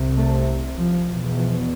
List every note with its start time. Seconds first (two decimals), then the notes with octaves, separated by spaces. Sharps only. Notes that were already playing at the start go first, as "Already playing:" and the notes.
Already playing: C2 C3
0.16 A3
0.77 F3
1.08 E2 B2
1.38 F3